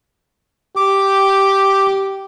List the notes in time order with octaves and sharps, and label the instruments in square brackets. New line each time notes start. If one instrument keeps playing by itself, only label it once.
[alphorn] G4 [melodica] D6